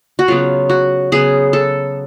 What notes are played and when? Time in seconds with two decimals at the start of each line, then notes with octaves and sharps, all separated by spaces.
0.19 F#4
0.28 C#3 F#3 B3 F4
0.70 F#4
1.12 C#3 F#3 B3 G#4
1.53 A4